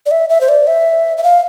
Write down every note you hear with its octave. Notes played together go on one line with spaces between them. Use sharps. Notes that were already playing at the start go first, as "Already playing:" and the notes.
D5
E5
E5
C5
D5
E5
E5
F5